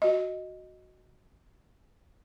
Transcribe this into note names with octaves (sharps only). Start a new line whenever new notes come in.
F#4 D#5